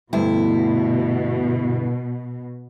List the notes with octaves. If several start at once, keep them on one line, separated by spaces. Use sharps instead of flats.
D2 G2 B2 E4